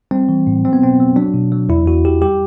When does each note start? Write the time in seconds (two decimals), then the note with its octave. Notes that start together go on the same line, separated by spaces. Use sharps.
0.11 G3 C4
0.29 E3
0.47 A2
0.65 F#3 C4
0.73 B3
0.82 B2 C4
1.00 F#3
1.16 F#3 D4
1.34 B2
1.52 F#3
1.69 E2 E4
1.86 E2 F#4
2.05 E2 G4
2.21 G3 G4